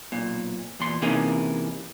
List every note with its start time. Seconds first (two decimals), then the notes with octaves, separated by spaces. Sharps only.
0.12 B1 A#2
0.80 E2 A#2 C6
1.02 C3 E3 A#3 C#4 D#4 G#4